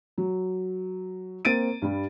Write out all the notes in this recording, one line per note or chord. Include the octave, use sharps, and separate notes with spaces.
F#3
A#3 C4 A6 D7 D#7
G2 G3